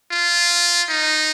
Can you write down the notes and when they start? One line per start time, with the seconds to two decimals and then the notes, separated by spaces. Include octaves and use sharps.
0.11 F4
0.90 D#4